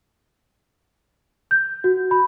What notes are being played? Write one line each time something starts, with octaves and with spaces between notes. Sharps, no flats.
G6
F#4
B5